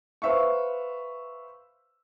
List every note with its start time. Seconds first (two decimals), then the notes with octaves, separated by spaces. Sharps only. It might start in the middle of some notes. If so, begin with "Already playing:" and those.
0.22 B4 C5 E5 F5 C#6